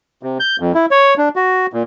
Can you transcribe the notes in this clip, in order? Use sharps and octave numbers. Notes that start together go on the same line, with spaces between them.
C3
G6
F2
E4
C#5
D4
F#4
A#2